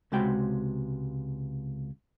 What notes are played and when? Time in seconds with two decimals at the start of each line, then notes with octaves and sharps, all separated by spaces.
0.12 C#2 C3 G#3 F#4 G5 B5